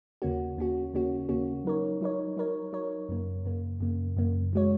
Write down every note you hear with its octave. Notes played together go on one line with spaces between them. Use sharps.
D#2 C#3 A#3 C#4 F#4
D#2 C#3 A#3 C#4 F#4
D#2 C#3 A#3 C#4 F#4
D#2 C#3 A#3 C#4 F#4
F#3 D#4 A#4 C#5
F#3 D#4 A#4 C#5
F#3 D#4 A#4 C#5
F#3 D#4 A#4 C#5
F#2 C#3 A#3
F#2 C#3 A#3
F#2 C#3 A#3
F#2 C#3 A#3
C#3 G#3 F#4 C#5